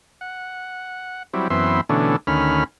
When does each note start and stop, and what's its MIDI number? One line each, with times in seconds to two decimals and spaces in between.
0.21 1.23 78
1.34 1.48 54
1.34 1.48 55
1.34 1.48 60
1.34 1.48 64
1.50 1.81 42
1.50 1.81 52
1.50 1.81 59
1.50 1.81 60
1.50 1.81 76
1.50 1.81 84
1.89 2.16 47
1.89 2.16 50
1.89 2.16 52
1.89 2.16 57
1.89 2.16 61
1.89 2.16 62
2.27 2.64 38
2.27 2.64 51
2.27 2.64 61
2.27 2.64 83
2.27 2.64 89